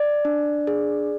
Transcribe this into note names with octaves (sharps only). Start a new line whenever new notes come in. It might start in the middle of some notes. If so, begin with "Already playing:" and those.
Already playing: D5
D4
G#4